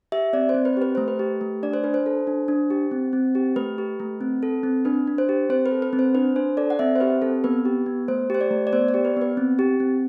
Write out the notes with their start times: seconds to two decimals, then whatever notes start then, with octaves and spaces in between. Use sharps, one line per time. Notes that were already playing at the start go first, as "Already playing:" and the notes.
0.12 G4 E5
0.33 C4 D5
0.49 C5
0.54 C4
0.65 B4
0.77 G4 B4
0.95 A3 C5
1.08 B4
1.19 G4
1.41 A3
1.63 D4 D5
1.74 C5
1.84 D4 B4
1.94 C5
2.06 A4
2.27 D4
2.48 D4
2.70 G4
2.91 C4
3.13 C4
3.35 G4
3.56 A3 B4
3.78 G4
4.00 A3
4.21 C4
4.43 A4
4.63 C4
4.85 D4 B4
5.07 D4
5.18 C5
5.29 G4
5.49 C4 C5
5.66 B4
5.71 A4
5.82 B4
5.93 C4
5.99 C5
6.14 D4 B4
6.36 D4 C5
6.57 A4 D5
6.70 F#5
6.79 C4 E5
6.96 C5
7.00 G4 B4
7.22 C4 A4
7.44 B3 B4
7.65 G4
7.86 B3
8.08 A3 C5
8.30 G4 C5
8.41 D5
8.51 A3
8.67 D5
8.73 B3 C5
8.88 D5
8.94 G4
9.05 B4
9.17 B3 B4
9.37 C4
9.59 G4
9.80 C4